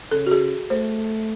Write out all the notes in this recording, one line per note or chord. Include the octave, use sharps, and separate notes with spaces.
C#3 A4
F#4
G#4
A3 C5